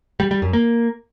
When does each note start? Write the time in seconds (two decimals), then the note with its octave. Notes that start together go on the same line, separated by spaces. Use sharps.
0.20 G3
0.31 G3
0.42 F#2
0.53 A#3